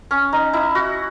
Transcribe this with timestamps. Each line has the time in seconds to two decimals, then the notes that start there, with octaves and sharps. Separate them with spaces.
0.11 C#4
0.33 D#4
0.53 E4
0.75 F#4